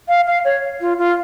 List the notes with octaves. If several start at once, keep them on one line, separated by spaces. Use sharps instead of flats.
F5
F5
C#5
F4
F4